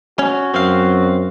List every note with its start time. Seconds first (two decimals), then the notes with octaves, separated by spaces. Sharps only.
0.19 C#4 F#4
0.54 F#2 C4 F5